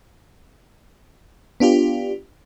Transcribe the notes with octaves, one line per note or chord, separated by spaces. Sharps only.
B3 D4 F4 G4